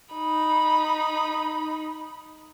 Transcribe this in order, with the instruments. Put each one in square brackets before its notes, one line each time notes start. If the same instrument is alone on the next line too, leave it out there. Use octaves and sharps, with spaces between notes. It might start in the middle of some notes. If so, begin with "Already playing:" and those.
[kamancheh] D#4 B5